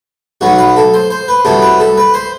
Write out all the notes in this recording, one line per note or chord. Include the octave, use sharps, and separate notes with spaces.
B1 B2 F#3 B3 F#4
B4
A4
C5
C5
B4
C2 C3 F#3 B3 A4
B4
A4
B4
C5